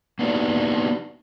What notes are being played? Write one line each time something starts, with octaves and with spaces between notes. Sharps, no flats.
A#3 B3 D4 D#4 F#4 G4